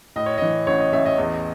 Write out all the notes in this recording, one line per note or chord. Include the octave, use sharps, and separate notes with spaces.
A2 D#5
C#5
E3 D#5
A1 C#5
D#5
A1 E5
D#5
E2